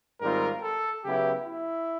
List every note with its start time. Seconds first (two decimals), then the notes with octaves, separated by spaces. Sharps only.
0.21 G#2 D#3 G3 C4 F4 A#4
0.62 A4
1.04 C#3 F#3 B3 E4 G4
1.45 E4